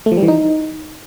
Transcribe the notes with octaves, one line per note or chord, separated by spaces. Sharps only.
A3
F3
G3
E3
D#4